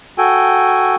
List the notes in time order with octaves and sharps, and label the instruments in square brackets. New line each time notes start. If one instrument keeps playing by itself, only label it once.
[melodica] F#4 A4 G5 G#5